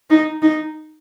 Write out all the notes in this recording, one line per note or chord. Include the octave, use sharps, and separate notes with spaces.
D#4
D#4